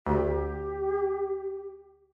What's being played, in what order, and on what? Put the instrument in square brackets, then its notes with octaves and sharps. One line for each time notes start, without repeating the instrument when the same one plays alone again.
[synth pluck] D2 [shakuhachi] G4